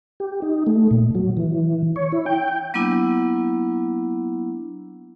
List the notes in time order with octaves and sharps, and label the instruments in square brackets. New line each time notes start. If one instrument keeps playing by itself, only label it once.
[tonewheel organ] G4
D#4
A3
A#2
F#3
E3
C#5
E4
G5
[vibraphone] F#3 A#3 B3 D4 E4